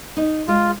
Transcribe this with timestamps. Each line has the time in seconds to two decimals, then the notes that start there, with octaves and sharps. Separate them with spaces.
0.17 D#4
0.48 G#3 F4